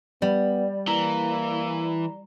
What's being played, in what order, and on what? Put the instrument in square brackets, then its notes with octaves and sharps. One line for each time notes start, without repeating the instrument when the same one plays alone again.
[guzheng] G3 [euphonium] B3
[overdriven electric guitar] E3 [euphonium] A#3 [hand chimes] A#5